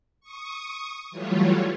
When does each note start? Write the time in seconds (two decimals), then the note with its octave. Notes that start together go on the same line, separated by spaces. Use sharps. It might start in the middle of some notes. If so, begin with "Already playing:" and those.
0.21 C#6 D#6
1.11 E3 F#3 G3 A3 F4 C#5